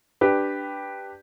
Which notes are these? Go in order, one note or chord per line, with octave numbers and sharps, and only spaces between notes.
D4 G4 B4